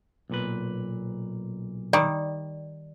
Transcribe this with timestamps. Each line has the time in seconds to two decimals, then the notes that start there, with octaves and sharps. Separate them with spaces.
0.30 B1 A#2 B4
1.93 D#3 G3 D5